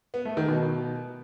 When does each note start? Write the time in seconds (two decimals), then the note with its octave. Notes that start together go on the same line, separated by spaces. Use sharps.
0.14 B3
0.25 A3
0.37 D#3
0.48 B2